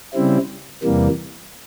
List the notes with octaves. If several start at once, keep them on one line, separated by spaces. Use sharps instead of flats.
C#3 G3 C4 E4
E2 C3 E3 G3 A#3